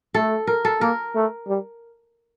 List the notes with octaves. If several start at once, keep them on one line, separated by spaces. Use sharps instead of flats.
A3 A4
A#4
A4
A#3 A#4
A3
G3